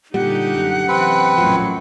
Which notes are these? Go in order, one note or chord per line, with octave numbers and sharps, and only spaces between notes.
A#2 D3 G3 D#4 G4 F#5
F#2
C3 E3 C4 B4
A#1 F#2 A2 F3 F#3